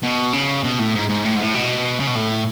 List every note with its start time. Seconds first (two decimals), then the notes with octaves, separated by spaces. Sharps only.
0.03 B2
0.33 C#3
0.64 B2
0.79 A2
0.95 G#2
1.09 G#2
1.24 A2
1.36 G#2
1.40 A2
1.54 B2
2.00 C#3
2.07 B2
2.15 A2